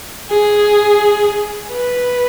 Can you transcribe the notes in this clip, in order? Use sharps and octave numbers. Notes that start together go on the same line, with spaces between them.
G#4
B4